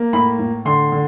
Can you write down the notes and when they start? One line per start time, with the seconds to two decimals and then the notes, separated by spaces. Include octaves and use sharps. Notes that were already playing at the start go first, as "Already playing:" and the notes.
Already playing: A#3
0.13 A2 B5
0.39 A2
0.65 D3 C6
0.92 D3